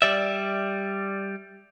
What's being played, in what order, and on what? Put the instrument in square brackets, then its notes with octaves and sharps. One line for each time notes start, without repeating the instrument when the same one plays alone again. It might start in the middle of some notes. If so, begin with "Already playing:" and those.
[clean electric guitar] G3 D5 E5